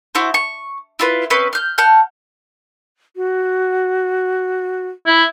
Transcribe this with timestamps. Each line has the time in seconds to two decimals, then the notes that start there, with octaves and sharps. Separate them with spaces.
0.15 E4 F#4 C5
0.34 C#6
0.99 E4 F4 B4
1.30 C4 C#4 B4
1.53 F6 G6
1.78 F#5 A5 F6 G6
3.16 F#4
5.06 E4